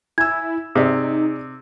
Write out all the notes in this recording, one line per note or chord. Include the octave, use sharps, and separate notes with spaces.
E4 G#5 E6 G#6
C3 D#4 G#4 D5